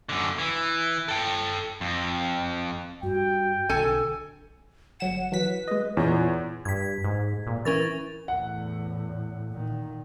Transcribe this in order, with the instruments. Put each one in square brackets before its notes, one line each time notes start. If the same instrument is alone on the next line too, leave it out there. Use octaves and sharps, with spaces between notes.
[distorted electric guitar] F#2 D3
E3
A4 G5
F2
[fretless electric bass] G2 [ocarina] F#4 [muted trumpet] G5
[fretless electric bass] B1 D3 [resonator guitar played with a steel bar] A4 G#5
[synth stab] G1 F#3 E7 [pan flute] F#5
[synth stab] E3 F#3 B6 [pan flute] B4
[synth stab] G#3 D#5
[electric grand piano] E2 [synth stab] A#2 C#4 [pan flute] F4
[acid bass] G2 [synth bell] G#6 B6
[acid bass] G#2
A#2
[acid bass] E3 [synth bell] C#4 A#4 A6
[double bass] E2 A2 [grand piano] F#5
[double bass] A#2 D#3